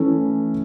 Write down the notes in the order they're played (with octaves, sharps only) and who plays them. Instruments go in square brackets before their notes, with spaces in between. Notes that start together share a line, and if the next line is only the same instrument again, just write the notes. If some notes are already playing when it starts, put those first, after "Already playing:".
Already playing: [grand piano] E3 A3 C#4 E4 A4